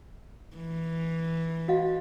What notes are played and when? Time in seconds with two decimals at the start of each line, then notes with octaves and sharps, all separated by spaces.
0.57 E3
1.68 F#4 D#5 F5